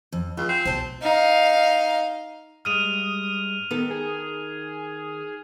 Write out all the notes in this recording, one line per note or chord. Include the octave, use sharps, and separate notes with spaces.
F2
C#2 F4
C4
B1 B3 C5 A5
D#4 F5
G2 G#3 D#6 F6 D#7 F7
D#3 B3 A4
G#4